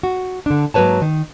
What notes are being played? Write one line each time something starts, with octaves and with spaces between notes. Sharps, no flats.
F#4
D3 D4
G#2 F#3 A#3 B4 C#5 A5
D#3